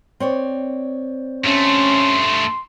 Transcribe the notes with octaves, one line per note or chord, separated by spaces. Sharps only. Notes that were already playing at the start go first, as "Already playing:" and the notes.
C4 C#5 D5
G2 A3 C#4 C6